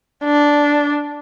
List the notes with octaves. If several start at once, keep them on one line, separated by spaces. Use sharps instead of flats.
D4